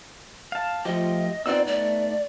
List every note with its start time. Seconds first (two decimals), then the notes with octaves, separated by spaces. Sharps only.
0.52 F5 A5
0.85 F3 A3 F4 G4 D#5
1.46 B3 C4 D#4 F4 D5 F#5 E6
1.67 A3 D5